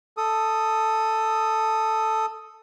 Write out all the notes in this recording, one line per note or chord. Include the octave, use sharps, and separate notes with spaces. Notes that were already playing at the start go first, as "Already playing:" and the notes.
A4 D#6